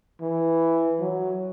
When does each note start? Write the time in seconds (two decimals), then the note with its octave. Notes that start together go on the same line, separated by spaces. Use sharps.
0.21 E3
1.00 F#3